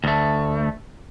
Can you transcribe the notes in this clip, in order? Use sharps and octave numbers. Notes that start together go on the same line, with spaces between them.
D2 A3